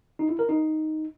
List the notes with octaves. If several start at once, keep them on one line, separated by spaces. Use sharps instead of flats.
D#4
E4
A#4
D#4